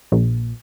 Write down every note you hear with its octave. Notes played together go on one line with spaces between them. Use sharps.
A#1